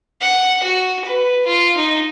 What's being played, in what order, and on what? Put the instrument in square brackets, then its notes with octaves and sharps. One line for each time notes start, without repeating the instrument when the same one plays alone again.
[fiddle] F#5
F#4
B4
F4
D#4